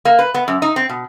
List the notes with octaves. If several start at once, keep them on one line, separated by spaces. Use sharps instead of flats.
A#3
B4
B3
F#2
D#4
C4
B2